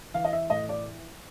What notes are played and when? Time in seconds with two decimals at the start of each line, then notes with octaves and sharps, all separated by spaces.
0.14 E3 F5
0.24 D#5
0.33 E5
0.50 A2 D#5
0.69 D5